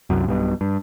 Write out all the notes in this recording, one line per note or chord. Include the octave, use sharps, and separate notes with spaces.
C2 F#2
B1 G2 B2
G2